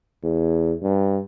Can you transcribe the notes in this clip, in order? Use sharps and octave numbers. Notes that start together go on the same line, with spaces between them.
E2
G2